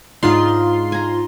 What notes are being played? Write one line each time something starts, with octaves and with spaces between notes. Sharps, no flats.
G#2 D4 D#4 F4 C6
G#5 A#5